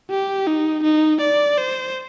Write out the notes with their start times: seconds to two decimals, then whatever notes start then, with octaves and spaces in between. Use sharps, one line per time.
0.11 G4
0.46 D#4
0.84 D#4
1.21 D5
1.57 C5